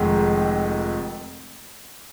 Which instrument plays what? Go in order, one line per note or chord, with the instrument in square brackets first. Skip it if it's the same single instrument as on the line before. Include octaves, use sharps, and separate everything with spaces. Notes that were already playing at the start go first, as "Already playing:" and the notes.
Already playing: [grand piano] F1 F2 D#3 G#3